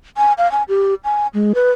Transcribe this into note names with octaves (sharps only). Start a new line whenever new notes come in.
G#5
F5
G#5
G4
G#5
G#3
B4